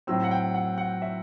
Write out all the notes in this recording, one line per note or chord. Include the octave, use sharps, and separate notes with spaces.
A2 F#3 C4 E6
F#5
G5
F#5
F#5
E5